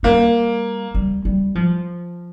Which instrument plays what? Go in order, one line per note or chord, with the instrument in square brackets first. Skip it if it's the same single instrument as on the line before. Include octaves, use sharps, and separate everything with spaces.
[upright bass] G3 [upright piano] A#3
[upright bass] G3
G3
F3